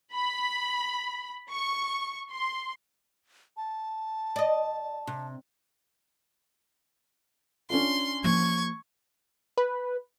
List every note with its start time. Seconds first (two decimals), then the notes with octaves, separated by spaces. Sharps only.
0.12 B5
1.51 C#6
2.30 C6
3.57 A5
4.36 D5 D#5
5.07 C3
7.70 C#4 D4 F4 C6
8.24 F3 A#3 C#6 G#6
9.58 B4